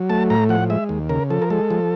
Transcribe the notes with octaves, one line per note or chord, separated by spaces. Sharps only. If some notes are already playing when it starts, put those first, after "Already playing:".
Already playing: F#3
A3 A5
A2 A#5
F3 F#5
G#3 E5
D#2
C#3 A#4
F3 A4
A#4
G#3 A4
F3